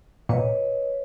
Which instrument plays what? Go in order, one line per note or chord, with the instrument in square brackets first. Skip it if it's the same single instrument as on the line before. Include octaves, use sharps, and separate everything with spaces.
[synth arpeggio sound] A#2 [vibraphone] B4 C#5 D#5